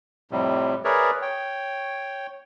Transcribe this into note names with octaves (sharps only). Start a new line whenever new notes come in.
F2 A2 C3 G3
G#4 A#4 B4 C#5 D5 E5
C#5 G5